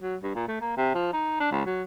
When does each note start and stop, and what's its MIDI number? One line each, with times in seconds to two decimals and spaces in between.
0.02 0.16 54
0.23 0.32 43
0.35 0.43 46
0.48 0.60 57
0.61 0.76 58
0.77 0.92 48
0.95 1.10 53
1.13 1.39 63
1.40 1.49 62
1.52 1.62 37
1.66 1.83 54